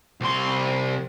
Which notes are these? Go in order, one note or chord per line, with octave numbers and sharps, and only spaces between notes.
C2 C6